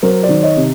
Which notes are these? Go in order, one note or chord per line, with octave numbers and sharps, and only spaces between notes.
F#3 A#4 C5
C5 D5
D#3
C#5 D#5
C3